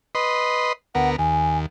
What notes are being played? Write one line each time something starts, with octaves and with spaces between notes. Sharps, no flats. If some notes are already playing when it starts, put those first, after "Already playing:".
B4 D#5 C6
D2 B3 A#4 F#5
D#2 G#5